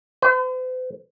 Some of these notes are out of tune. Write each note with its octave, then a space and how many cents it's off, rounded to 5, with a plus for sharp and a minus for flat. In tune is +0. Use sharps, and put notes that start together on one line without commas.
C5 -45